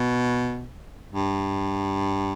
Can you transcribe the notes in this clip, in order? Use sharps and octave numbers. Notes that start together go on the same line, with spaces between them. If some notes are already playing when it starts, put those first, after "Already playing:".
Already playing: B2
G2